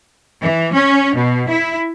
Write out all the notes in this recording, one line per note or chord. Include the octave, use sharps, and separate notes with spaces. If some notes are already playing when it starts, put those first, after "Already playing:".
E3
C#4
B2
E4